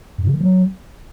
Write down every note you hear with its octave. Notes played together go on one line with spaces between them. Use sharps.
G2
C#3
D#3
F#3